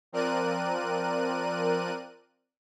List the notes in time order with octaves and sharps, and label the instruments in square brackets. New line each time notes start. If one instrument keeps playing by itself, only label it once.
[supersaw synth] F3 C4 A#4 D5 F#6 D#7